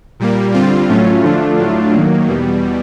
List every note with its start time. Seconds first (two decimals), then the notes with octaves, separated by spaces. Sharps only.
0.20 A#2 G3 A#3
0.54 D3 G3 C4 F4
0.89 A2 F#3 A3 C#4 F4
1.23 D3 F3 A3 D4 F4
1.59 A2 F#3 A3 D4 F4
1.94 D#3 F#3 A#3
2.28 E2 B2 G3